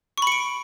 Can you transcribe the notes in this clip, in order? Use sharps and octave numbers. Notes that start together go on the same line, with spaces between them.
B5 C#6 C#7 D7